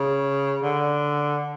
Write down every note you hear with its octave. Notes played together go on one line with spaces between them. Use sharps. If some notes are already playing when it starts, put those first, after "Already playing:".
Already playing: C#3
D3